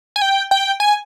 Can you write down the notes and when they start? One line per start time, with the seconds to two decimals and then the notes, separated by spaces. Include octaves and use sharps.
0.16 G#5
0.22 G5
0.51 G5
0.80 G#5